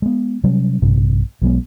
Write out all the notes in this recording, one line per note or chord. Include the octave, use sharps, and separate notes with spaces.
G#3 B3
C3 F#3 G3 C#4
A#1 G2 C3
B1 F#3 G#3 B3